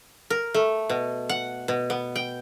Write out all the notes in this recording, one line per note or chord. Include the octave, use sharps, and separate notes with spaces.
A#4
A3
B2
F#5
B2
B3
G5